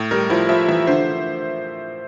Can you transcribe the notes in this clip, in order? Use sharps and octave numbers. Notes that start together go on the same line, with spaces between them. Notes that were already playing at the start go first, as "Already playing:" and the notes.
Already playing: A2
G3 A#4
F3 E4
F3 E5
E3 E5
D3 C5